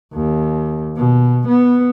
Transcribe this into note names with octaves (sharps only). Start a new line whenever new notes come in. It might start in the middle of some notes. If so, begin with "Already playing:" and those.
D#2
B2
B3